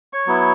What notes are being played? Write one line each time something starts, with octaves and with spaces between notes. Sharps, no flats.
C#5 C#6
F#3 B3 E4